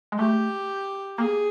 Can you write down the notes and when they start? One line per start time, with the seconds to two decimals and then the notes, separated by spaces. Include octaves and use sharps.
0.12 G#3
0.18 A3 G4
1.18 A#3 G#4